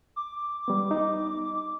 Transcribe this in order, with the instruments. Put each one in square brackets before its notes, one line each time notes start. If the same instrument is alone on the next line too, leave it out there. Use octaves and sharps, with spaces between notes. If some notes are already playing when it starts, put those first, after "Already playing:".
[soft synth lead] D6
[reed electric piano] G3 B3
D#4